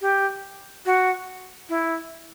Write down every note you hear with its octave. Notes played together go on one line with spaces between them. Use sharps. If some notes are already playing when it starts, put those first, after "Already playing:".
G4
F#4
E4